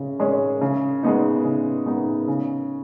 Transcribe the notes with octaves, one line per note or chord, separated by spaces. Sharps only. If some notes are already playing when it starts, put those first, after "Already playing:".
Already playing: C#3 G#3 C#4
G#3 C#4
C#3
G#3 B3 D#4
C#3
G#3 B3 D#4
C#3